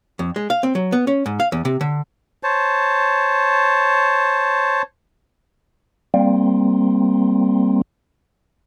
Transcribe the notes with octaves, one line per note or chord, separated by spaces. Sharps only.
F2
G#3
F5
C4
F#3
B3
C#4
G#2
F5
E2
C3
D3
C5 C#5 A5
G3 A#3 C4